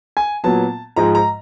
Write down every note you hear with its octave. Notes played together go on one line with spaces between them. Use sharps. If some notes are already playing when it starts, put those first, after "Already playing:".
G#5
A#2 F#3 B3 A5
G#2 F3 G#3 A#5
A#5